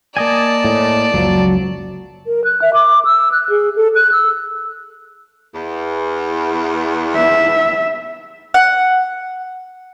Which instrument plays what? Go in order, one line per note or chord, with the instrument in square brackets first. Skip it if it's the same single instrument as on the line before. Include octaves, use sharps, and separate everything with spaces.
[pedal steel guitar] A#3 D#5 G#5 [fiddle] D5 A5
[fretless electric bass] A2
[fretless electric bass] F#1 C#2 F3 [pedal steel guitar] F#3
[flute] A#4
F#6
E5
D6
E6
F#6
G#4
A4
F#6
E6
[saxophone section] E2
[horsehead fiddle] E5
[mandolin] F#5